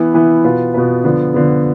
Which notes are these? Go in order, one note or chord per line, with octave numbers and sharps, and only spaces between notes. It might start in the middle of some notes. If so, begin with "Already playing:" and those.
Already playing: E3 B3 E4
E3 B3 E4
B2 B3 F4 B4
B2 B3 F4 B4
D3 F3 B3
D3 F3 B3